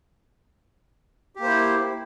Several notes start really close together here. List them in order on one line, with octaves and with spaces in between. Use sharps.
G4 A#3 C5 E4